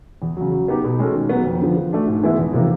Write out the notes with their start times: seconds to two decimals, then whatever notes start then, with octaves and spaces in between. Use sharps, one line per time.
0.22 E2
0.37 C#3 F#3
0.52 F#3
0.68 B3 D#4 G4
0.84 B2
0.99 G#3 C#4 F#4 A4
1.15 D#3
1.29 F#3 B3 D#4
1.46 F2
1.61 D3 F3
1.77 F3
1.92 A3 D4 F#4
2.08 G#2
2.23 E3 G#3 B3 E4
2.38 E2
2.53 C3 F3 A#3 D#4